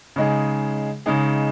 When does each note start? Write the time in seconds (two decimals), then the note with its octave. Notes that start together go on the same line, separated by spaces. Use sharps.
0.16 C#3 G#3 D#4 G#4
1.06 C#3 G#3 D#4 G#4